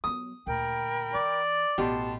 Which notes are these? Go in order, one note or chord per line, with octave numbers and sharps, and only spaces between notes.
F#3 B3 D#6
D2 A#2 A#4 G5 B5
E3 D5
A1 B2 G4 A5 C6